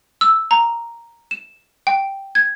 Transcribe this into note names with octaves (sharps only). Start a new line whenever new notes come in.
E6
A#5
E7
G5
G#6